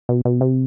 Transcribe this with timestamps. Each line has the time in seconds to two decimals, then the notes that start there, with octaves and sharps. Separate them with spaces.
0.09 B2
0.25 B2
0.41 C3